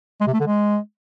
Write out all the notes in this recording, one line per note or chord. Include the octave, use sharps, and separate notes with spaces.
G#3
C3
A3
D3
G#3